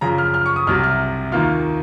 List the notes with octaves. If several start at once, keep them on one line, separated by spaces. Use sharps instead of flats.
F#2 C#3 F3 A#5
F6
F6
C#6
D#6
C2 C3 F#3 F6
F6
D#2 D#3 A#3 F4 F6